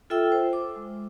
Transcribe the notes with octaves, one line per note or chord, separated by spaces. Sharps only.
F4 A4 E5 G5 E6
C5
D6
G#3